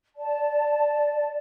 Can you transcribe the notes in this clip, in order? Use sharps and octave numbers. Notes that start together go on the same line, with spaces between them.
D5 A5